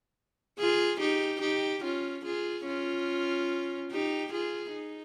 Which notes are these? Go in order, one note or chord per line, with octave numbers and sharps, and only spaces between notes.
F4 G#4
D#4 G4
D#4 G4
C#4 F4
F4 G#4
C#4 F4
D#4 G4
F4 G#4
D#4